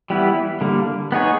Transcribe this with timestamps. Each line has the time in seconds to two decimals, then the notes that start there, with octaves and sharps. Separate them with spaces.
0.10 E3 G3 B3 E4
0.61 D3 G3 A#3
1.12 B3 D#4 G#4 C#5